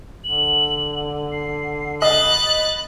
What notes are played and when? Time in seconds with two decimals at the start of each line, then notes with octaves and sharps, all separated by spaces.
0.24 D3 F#7
1.32 C7
2.02 D#5 B5 F#6 A6